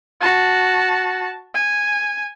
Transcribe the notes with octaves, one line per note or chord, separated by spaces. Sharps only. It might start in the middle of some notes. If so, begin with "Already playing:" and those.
F#4 A5
G#5